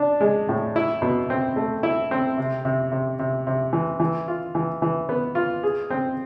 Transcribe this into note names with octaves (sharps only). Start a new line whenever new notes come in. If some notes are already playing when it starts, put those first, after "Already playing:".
Already playing: D4
G#3
A2
E4
B2
C4
A3
E4
C4
C3
C3
C3
C3
C3
E3
E3
F4
E3
E3
B3
F4
G#4
C4